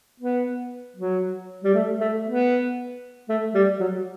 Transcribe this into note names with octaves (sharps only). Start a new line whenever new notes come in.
B3
F#3
G3
A3
A3
B3
A3
G3
F#3